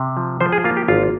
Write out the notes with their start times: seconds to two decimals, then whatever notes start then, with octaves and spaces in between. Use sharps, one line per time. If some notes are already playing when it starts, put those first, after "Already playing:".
Already playing: C3
0.17 F3
0.40 F3 C5
0.52 G#4
0.64 A#3 F4
0.77 G4
0.88 G#1 F4